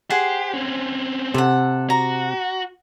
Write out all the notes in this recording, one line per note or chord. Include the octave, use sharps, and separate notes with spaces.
G4 G#4 C5 F#5
C4 C#4
C3 A4 F#5
F#4 A#5